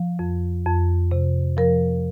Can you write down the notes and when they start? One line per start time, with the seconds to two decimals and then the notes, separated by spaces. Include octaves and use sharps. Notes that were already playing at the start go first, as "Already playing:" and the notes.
Already playing: F3
0.19 F2
0.66 F2
1.11 C3
1.57 F3 A#4